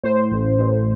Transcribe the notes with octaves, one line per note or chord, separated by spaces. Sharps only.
A2 C5
A1
A1